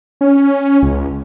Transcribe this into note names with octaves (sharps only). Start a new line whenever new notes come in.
C#4
C#2